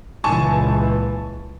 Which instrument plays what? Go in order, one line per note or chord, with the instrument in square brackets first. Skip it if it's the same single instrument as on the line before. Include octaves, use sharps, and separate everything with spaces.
[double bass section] C#2 A#2 E3 [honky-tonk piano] G#5 A5 C#6